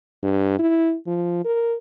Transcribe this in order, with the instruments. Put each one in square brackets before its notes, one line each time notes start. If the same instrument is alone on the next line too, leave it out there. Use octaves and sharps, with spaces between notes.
[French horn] G2
E4
F3
A#4